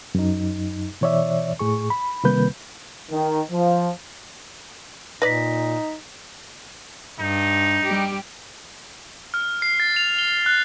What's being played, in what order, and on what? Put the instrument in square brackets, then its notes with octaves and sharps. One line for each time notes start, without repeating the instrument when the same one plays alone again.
[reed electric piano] F#2 D#4
B2 E3 C#5 D5 E5
A2 G#4 C#6
B5
C3 D#3 G3 A#3 B4 G6
[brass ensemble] D#3
F3
[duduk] A#2 [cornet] D#4 [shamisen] B4 D5 [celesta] A#6 B6
[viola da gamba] G2 [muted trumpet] D#4
[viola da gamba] G3 G4
[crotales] F6
C7
A6
F7
G7
F#6